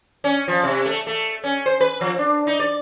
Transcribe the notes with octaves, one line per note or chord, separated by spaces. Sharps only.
C#4
F3
C3
A3
A3
C#4
C5
B4
F3
D4
D#4
D5